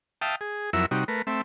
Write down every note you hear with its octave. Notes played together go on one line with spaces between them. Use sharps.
E5 F5 G5 A5 D#6
G#4
F2 F#3 E4 A#4 E5 E6
C3 G3 D#4 F#4
A3 A#4 B4
A3 C4 E5